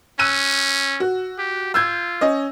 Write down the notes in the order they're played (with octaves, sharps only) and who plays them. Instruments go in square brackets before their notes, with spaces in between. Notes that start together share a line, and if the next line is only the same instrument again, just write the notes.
[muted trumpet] C#4 [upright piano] E6 F#6 D#7
[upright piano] F#4
[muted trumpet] G4
[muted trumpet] F4 [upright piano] E6 G6 G#6
[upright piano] C#4 D#5